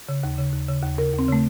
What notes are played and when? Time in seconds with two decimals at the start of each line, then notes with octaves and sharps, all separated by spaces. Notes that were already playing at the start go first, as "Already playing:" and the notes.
0.09 C#3
0.23 D#2
0.38 C#3
0.53 D#2
0.69 C#3
0.83 D#2
0.98 C#3 A#4
1.13 D#2
1.19 C4
1.28 C#3 A3